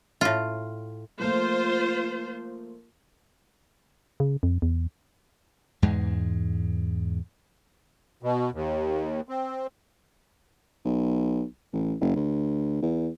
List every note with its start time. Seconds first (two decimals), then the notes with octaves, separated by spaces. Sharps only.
0.21 A2 F4
1.20 F3 A3 A#3 F4 C5
4.20 C#3
4.43 F2
4.62 E2
5.82 E2 G#2 G#3
8.23 B2
8.53 D#2
9.29 C4
10.85 B1
11.73 A1
12.01 F#1
12.16 D2
12.83 E2